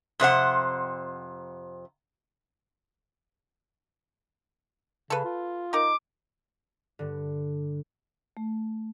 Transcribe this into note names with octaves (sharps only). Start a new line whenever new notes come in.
F2 C3 C5 F#5
C#3 A4 B4
F4
D#4 A#4 D6
G2 D3
A3